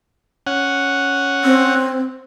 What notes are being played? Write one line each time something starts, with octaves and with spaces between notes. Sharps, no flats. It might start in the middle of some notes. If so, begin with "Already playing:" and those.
C#4 F#5
C4